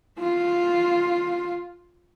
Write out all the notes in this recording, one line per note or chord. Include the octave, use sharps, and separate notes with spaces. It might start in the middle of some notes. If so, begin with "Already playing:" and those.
F4